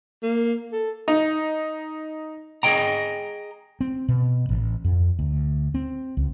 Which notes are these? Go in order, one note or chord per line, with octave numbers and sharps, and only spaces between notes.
A#3
A4
D#4
G#4 A4 D#5 G5 A#5
C4
B2
A1
F2
D2
C4
C#2